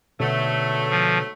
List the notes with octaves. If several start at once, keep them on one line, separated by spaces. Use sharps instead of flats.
G#2 B2 D3 F#3 A3
F3